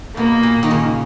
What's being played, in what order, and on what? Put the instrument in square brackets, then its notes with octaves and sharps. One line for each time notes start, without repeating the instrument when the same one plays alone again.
[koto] B2 [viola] A#3
[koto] A#2
D#3
C#3